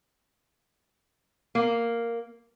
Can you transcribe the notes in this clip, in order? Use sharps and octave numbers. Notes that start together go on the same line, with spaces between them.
A#3